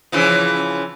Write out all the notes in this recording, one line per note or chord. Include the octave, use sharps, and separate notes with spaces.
C#3 E3 F3